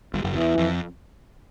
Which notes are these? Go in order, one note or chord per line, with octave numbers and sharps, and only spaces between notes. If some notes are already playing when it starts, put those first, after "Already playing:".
G1 G2
F#1 F#2
E2 E3
F2